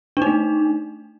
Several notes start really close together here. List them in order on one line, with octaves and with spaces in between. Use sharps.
D4 D#4 A3